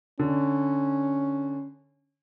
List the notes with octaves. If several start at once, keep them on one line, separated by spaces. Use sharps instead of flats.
D3 C#4